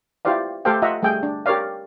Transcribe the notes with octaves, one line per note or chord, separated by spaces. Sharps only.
E4 F4 G4 C5 D5 F5
A3 G4 A4 C5 F5 G5
F4 D#5 E5 F#5 A#5
G3 A3 G#4 G5
D4
G4 A#4 C#5 D5 F5